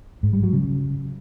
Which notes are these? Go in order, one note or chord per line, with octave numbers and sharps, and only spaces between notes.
G#2
G3
F#3
C#3